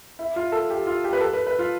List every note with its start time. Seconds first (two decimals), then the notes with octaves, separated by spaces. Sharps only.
0.19 E4
0.36 F4
0.52 A4
0.70 G4
0.87 F4
1.04 G4
1.13 B4
1.20 A4
1.33 B4
1.47 B4
1.59 F4